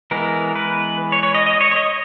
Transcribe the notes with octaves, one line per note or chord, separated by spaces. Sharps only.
E3 G#3 B3 A#4
B4
C#5
C#5
D#5
D#5
C#5
C#5
D#5